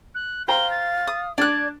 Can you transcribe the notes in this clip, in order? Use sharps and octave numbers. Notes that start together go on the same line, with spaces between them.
F#6
C5 F5 G5 A#5 G7
A6
D#6
D4 D5 F#6 G#6